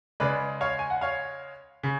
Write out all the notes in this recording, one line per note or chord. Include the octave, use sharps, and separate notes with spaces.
C#3 G#3 B4 D5
C#5 F5
G#5
F#5
C#5 F5
C#3